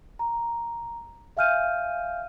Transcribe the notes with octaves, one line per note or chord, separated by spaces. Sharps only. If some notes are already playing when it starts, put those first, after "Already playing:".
A#5
E5 F5 G#5 F6 G6 D#7